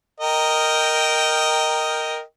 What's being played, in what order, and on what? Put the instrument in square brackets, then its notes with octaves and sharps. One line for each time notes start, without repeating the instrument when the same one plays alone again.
[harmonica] A#4 D#5 G5